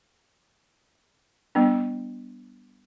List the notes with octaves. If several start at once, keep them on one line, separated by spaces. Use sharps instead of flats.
G3 B3 D4